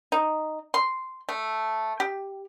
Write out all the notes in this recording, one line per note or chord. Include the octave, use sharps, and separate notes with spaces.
D#4
C6
A3
G4